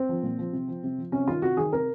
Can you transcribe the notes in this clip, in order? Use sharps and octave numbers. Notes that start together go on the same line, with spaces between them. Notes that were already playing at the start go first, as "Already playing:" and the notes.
Already playing: C4
F3
A#2
F3
C3
F3
C3
F3
C3 C#4
D#3 F4
C3 F#4
D#3 G#4
C3 A#4